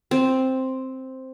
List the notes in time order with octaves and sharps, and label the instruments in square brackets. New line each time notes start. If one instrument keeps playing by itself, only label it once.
[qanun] C4